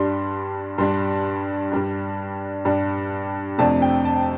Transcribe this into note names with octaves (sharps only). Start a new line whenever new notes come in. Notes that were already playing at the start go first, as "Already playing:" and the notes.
Already playing: G2 G3 D4 C6
G2 G3 D4 C6
G2 G3 D4
G2 G3 D4
F2 C3 A3 D4 A5
G5
A5